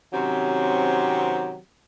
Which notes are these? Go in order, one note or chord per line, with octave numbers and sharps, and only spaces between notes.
C3 D#3 F#3 C4 C#4 G4